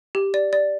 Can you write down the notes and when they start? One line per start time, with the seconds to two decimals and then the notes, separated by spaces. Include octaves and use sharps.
0.15 G4
0.34 D5
0.53 D5